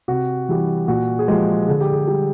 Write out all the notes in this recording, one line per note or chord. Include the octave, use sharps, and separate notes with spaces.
C3 F#4
E3 G3
A#2 F#4
G#4
F3 G#3 G4
D3 G#4
G4
G#4
G3